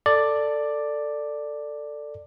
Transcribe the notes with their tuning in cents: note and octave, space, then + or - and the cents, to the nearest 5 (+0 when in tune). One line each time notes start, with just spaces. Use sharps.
A4 +15 D5 +5